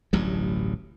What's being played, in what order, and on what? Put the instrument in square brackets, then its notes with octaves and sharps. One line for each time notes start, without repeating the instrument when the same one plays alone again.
[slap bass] D1 A1 G2 F#3